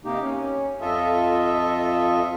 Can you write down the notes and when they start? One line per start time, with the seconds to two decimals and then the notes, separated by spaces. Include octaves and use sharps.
0.05 C3 A#3 D#4 G4
0.22 C#4
0.81 F2 F4 A4 D#5 E5